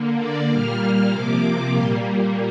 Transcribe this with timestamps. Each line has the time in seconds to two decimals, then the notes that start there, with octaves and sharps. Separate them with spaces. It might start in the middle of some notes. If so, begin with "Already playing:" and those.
Already playing: D3 A#3
0.18 D5
0.49 A#2 G3 A#3 F6
1.11 C3 F3 A#3 D6
1.74 A#2 G3 A#3 C6